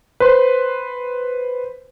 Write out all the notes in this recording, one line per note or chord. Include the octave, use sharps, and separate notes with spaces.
B4 C5 C6